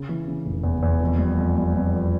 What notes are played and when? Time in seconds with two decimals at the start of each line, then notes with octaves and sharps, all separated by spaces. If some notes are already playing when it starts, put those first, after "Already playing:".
Already playing: C#3
0.09 E3
0.28 C#3
0.46 F1
0.64 E2
0.83 E2
1.01 F2
1.19 G3
1.38 F2
1.56 G3
1.74 F2
1.93 F2